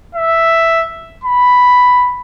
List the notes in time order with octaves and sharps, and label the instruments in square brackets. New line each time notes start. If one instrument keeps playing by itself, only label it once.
[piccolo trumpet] E5
B5